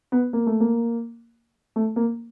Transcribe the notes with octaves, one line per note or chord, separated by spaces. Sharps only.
B3
A#3
A3
A#3
A3
A#3